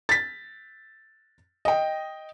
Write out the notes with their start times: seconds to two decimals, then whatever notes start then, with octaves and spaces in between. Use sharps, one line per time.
0.09 A6 B6
1.65 D#5 G5